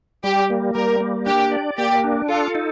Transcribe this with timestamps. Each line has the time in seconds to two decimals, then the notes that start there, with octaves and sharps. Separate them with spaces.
0.24 G3 G4
0.50 A#3
0.75 G3 A#4
1.00 A#3
1.26 D4 G4
1.52 D5
1.78 A#3 G4
2.04 D4
2.28 F4 A4
2.55 D#4